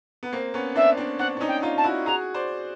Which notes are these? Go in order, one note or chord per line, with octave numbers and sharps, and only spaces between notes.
B3
A#3 C4
B3 C#4
C4 D4 E5
C4 D4
C4 D4 F#5
D4
C#4 D#4
G5
D#4 F4
A5
E4 F#4
F#4 G#4 A#5
C5 D5